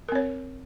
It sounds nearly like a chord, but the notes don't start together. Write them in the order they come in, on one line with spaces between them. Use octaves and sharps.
A#4 C4 C#5